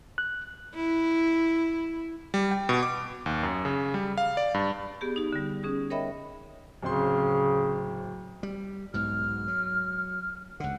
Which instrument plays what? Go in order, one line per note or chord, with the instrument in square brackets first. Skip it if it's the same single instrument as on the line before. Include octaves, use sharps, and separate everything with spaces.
[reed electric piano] F#6
[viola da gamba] E4
[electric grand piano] G3
G5
B2
D6
D#2
F#2
C#3
G3
F5
D5
G2
[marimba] B3 G4 G#4
D#4 G4
D3 G3
C#4 G#4 D#6
A#4 C#5 D#5 E5 G5 B5
[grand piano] D1 C4 C6 [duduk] C#3
[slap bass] G3
[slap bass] B1 G#2 B2 [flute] F6
[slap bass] F#3
[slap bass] C#2 D3 [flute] F#5